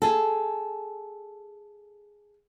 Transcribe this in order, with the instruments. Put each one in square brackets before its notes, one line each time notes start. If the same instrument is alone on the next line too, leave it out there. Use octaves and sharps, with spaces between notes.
[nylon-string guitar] G#4 A4